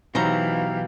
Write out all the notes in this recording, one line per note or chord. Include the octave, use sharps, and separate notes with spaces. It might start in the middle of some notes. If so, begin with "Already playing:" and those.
B2 E3 F#3 D#4 G4 C5 F5 A#5